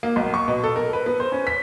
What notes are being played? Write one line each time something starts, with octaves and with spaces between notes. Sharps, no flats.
A#3
B1
C#6
B2
A4
A#4
B4
B3
C5
C#4
B6